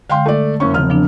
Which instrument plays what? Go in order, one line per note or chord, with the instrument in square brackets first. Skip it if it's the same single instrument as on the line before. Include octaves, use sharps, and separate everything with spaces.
[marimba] D3 G#3 [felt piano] F5 G5 C6
[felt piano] A3 D5
F#1 C#4 C#6
[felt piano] E1 F6 [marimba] C#3 F3 C4
[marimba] F3 B3 D4